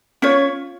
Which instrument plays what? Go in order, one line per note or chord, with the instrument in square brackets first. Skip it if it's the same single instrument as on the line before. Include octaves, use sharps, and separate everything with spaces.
[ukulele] C#4 F4 C#5